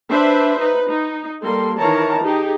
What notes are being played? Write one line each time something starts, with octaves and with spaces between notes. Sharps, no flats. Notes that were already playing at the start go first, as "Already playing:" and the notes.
D4 B4 C5 E5
D#4 B4
D#4
G3 A#3 A4 C6
D#3 E3 A#4 C#5 A5 A#5
D#4 G4 G#4